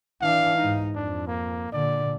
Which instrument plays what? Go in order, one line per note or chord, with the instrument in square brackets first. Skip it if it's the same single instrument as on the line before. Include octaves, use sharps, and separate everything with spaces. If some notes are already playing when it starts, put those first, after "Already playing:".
[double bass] E3 D4 [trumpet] F5
[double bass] G#2 D#4
[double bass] F2 [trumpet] D4
[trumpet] A#3
[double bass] A#2 D3 [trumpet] D5